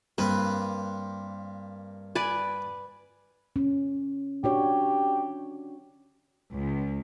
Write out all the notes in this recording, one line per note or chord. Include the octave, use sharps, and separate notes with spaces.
G2 A#3 C4 B4
B4 D5 G#5
C#4
D4 F#4 G4 C#5
C#2